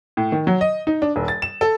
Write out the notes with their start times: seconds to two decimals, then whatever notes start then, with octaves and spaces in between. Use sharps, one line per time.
0.17 A2
0.32 D#3
0.47 F#3
0.61 D#5
0.87 D#4
1.02 D4
1.16 D#1
1.28 A6
1.42 E7
1.61 A4